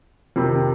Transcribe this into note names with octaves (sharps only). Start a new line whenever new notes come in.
F2 C3 D#3